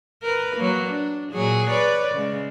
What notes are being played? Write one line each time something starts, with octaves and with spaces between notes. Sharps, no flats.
A#4 B4
F#3 A#3
D4
A#2 F#3 G#4
B4 C#5 D5
C#3 G#3